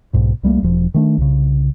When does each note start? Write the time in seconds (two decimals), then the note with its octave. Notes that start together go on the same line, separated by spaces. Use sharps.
0.13 B1 G#2 B2
0.43 C2 G3 A3 A#3
0.63 E1 F3
0.94 D#3 A3 D4
1.18 C2 C#3